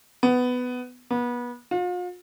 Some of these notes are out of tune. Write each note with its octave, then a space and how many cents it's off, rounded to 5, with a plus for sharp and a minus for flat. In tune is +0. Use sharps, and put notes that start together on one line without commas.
B3 +10
B3 -30
F4 +40